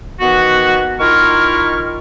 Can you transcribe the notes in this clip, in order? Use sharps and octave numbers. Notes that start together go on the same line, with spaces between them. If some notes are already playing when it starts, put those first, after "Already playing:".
D#3 E3 B3 F#4
D#3 E4 F4 A#4 C#6 F6